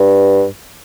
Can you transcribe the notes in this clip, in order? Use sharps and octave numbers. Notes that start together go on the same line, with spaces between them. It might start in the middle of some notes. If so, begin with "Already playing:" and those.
Already playing: G2